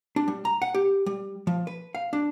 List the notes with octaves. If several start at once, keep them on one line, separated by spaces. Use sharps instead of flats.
D4
G3
A#5
F#5
G4
G3
F3
B4
F5
D4